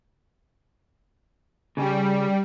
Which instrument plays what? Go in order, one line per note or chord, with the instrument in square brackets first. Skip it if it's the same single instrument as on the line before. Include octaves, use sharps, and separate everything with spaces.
[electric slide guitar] C#3 [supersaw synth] G3